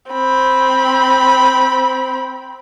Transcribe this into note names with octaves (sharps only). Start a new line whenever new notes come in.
C4 B5